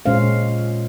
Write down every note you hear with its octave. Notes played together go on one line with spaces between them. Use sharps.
A#2 G#3 C#4 C5 F5